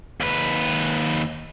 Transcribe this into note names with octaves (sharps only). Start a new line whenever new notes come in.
D#2 B4